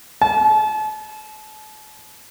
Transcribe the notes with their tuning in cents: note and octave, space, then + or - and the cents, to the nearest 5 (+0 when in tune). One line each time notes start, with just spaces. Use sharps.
A5 -40